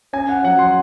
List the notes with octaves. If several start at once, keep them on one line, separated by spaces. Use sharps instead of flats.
C#4 G#5
F#5
F#3 F#5
C6